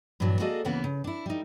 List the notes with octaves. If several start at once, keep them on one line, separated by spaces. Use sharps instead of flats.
G2 A#2 E3 F#3 D4
A#3 F#4 G#4 A4 D5 D#5
D2 C#3 E3 A#3 B3 F#5
C#3
D4 E4
G3 D#4